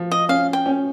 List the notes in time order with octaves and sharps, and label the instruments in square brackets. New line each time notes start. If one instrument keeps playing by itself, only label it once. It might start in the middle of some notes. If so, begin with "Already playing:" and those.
Already playing: [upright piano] F3
[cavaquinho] D#5
[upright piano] C#4 [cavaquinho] F5
[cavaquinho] G5
[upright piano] C#4